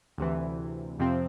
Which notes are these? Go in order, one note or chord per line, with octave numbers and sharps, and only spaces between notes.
D2 C3 E3
F2 C3 F3 C4